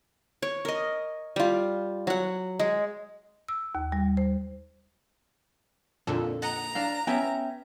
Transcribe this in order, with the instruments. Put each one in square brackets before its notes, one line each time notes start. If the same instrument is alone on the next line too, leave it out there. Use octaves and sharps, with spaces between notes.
[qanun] C#5
A#4 D#5
G3 F4
F#3 F#5
G#3
[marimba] E6
D#2
G3
C5
[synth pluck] F2 A#2 D3 [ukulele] A4
[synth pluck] D#5 F#5 [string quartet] A#5
[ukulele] D4 F5
[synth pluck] B3 [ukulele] C#4 E5 G5